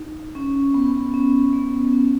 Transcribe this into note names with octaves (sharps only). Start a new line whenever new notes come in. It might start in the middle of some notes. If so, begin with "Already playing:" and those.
Already playing: D#4
C#4
B3
C#4
B3
B3
C#4